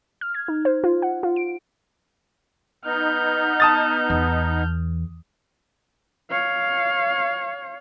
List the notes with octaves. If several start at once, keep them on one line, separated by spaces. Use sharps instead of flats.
F6
G#6
D#4
C5
F4
F#5
F4
D7
B3 D#4 F6 G6
A5 D#6 A6
E2
C#5 F5